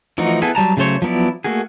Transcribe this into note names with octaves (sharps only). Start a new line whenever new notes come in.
E3 F3 A3 D#4 F#4
B3 E4 G#4 A4 B4
F#3 G3 A5 A#5
C#3 F#3 A3 C5 C#5
F3 F#3 B3 E4 D5
A3 A#3 F#4 G#4